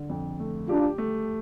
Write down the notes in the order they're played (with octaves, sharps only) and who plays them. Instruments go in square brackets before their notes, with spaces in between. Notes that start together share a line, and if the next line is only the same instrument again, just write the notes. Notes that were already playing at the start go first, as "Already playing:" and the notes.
Already playing: [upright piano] D3 D4
F2
A3
[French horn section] D4 F4 [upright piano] G4
[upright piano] A3